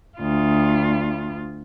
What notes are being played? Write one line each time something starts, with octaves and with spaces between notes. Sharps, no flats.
D2 F4